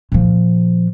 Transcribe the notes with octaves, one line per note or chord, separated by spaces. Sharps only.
A#2 F3